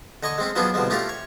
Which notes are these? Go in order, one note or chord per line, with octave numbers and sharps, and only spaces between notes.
D3 D#5 G#5 C#6
G#3 C4 C#4
F3 F#3 B3 C#4 D4 G#4
C2 B2 D3 F3 G#3
A3 C#4 D4 F4 G4 A#4
C#5